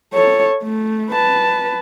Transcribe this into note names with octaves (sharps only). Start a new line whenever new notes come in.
A4 C#5
A3
B4 A5